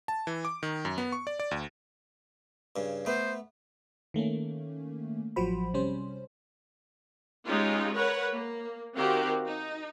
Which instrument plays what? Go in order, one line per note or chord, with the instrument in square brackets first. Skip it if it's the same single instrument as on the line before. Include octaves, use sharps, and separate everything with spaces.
[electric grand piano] A5
E3
D6
D#3
F#2
B3
C#6
D5
D5
D2
[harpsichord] G2 C#3
[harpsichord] A3 B3 [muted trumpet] C5
[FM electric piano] D#3 A3 A#3 C#4
A1 F3 F#3 F#4 C5 B5
C3 G3 C#4 C5
[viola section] G#3 C#4 D#4 F4 G4
A#4 B4 C#5 F#5
A#3
D#3 C4 F#4 G4 A#4 F5
D#4